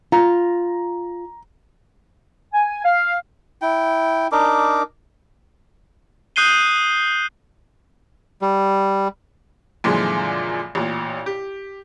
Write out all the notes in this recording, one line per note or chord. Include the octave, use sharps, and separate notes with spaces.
F4 A#5
G#5
F5
E4 G5
D4 D#4 A#4 D6
D#6 F#6 G6 C7 D#7 G7
G3
F#2 A#2 D3 E3 F3 G#3
A1 A#2
G4